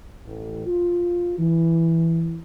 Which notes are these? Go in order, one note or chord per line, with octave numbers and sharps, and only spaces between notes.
A1
F4
E3